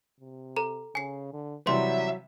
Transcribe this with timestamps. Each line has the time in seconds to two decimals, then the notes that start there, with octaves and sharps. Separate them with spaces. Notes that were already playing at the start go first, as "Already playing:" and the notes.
0.20 C3
0.57 A4 A#5
0.95 C#3 G#5 C7
1.33 D3
1.67 C3 E3 F#3 G3 E5 C6